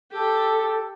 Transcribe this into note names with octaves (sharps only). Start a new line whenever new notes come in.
G4 A4